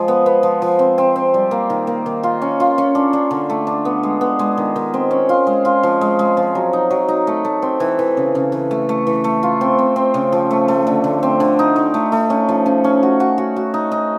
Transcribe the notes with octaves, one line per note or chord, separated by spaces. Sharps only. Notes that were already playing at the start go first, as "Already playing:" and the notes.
Already playing: F3 G#3
B3
B3
F3
F3
C4
C4
C4
G3
A#3
D#3
A#3
D#3
F4
C#4
F4
C#4
D4
D4
D3
A3
D4
B3
G#3
B3
G#3
D#3
D#3
C4
C#4
F4
G#3
F4
F3
G#3
G#3
F3
F#3
D#4
F#3
D#4
A3
A3
C4
E3
E3
C#3
C#3
E3
A3
A3
E3
A3
F4
C4
C4
C4
C#3
F3
A3
A3
D3
D3
C4
D3
D#4
D#4
A3
A3
C#4
F3
C#4
C#4
F#4
F#4
F#4
F#4
D#4
D#4